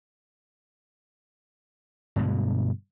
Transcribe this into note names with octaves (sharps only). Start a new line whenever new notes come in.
G2 B2 D3 G#3